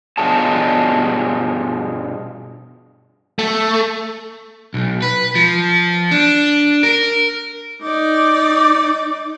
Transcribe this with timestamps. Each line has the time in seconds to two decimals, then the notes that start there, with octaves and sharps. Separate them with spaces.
0.18 G2 B2 F4 G#4 C#5 A5
3.39 A3
4.74 B1
5.02 B4
5.35 F3
6.11 D4
6.83 A#4
7.82 D#4 D5